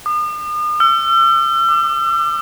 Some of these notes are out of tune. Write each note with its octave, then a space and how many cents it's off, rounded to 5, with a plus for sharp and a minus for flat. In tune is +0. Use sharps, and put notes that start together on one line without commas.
D#6 -40
E6 +45
D6 +35